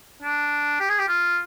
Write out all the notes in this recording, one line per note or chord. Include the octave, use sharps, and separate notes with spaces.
D4
G4
G#4
G4
F4